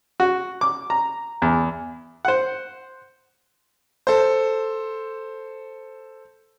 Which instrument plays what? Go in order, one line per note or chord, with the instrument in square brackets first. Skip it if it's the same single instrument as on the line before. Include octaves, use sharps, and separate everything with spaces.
[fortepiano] F#4
D6
A#5
E2
C5 F#5
[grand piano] A4 C5